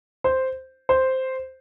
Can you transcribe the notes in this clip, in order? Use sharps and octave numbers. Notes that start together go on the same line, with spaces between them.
C5
C5